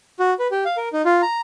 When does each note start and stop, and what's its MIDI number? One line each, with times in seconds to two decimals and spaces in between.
0.19 0.34 66
0.39 0.47 71
0.51 0.64 67
0.65 0.77 77
0.77 0.89 70
0.93 1.02 63
1.05 1.22 65
1.22 1.41 82